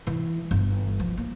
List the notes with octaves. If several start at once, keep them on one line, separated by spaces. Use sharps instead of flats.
E3
G1
F3
A#3